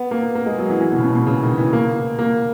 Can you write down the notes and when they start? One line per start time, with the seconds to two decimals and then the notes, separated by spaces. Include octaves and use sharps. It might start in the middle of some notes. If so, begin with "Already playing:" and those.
Already playing: B3
0.11 A#3
0.35 A#3
0.46 G#3
0.58 F#3
0.70 E3
0.81 E3
0.92 B2
0.98 C#3
1.03 B2
1.10 A#2
1.15 B2
1.27 C#3
1.42 D#3
1.58 E3
1.73 A#3
2.19 A#3